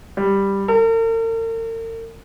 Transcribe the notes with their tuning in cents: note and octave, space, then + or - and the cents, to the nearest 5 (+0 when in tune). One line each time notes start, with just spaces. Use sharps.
G3 +5
A#4 -45